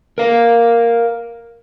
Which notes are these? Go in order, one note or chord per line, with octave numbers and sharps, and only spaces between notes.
A#4 F5